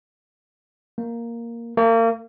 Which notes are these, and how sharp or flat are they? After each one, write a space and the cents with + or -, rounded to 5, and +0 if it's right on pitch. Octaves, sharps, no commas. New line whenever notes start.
A#3 +0
A#3 -35